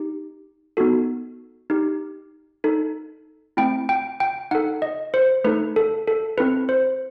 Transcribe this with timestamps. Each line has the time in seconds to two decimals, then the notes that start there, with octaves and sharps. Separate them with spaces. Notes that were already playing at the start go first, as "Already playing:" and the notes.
Already playing: D#4 G4
0.77 B3 D#4 F#4 A4
1.70 D#4 G4
2.64 D#4 A4
3.57 A3 C4 E4 G5
3.89 G5
4.20 G5
4.51 D#4 A4 F#5
4.82 D#5
5.14 C5
5.44 A3 D#4 A4 B4
5.76 A4
6.08 A4
6.38 C4 E4 A4 B4
6.69 C5